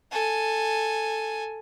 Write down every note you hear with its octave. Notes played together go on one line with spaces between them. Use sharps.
A4 G#5